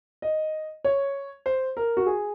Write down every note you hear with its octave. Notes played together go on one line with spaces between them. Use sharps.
D#5
C#5
C5
A#4
F#4
G#4